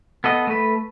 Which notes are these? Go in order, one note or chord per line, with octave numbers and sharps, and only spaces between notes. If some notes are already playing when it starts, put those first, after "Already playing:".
B3 A4 D#5 F#5
A3 B4